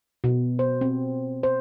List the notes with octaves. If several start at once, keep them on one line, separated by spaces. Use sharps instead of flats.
B2
C5
C4
C5